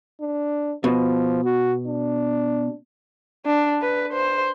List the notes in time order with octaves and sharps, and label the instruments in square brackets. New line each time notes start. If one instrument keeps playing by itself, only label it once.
[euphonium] D4
[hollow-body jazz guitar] B2 [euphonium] F3
[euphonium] F#4
D4
[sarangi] D4
B4
C5